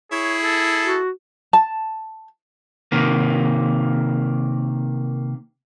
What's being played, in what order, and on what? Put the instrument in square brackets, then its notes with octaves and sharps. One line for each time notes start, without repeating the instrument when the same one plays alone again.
[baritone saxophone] E4 [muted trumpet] G#4 [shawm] C#5
[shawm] A4
[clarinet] F#4
[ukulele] A5
[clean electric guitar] C3 D#3 A#3